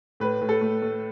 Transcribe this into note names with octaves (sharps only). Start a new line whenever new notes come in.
A2 B4
A2
A4
A3
A3